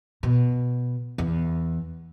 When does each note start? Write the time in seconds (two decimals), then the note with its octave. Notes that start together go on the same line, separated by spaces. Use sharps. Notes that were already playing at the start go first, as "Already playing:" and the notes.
0.23 B2
1.18 E2